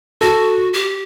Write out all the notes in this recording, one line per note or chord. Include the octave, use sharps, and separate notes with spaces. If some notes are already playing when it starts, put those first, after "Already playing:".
F#4 A4
G4